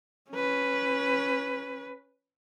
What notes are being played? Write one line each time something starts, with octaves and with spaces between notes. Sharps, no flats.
C#4 B4